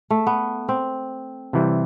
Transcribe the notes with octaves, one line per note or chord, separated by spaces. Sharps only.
A3
B3
C4
C3 E3 G3